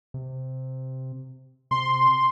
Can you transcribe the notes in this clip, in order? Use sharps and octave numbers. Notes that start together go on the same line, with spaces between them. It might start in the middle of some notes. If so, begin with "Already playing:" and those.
C3
C3 C6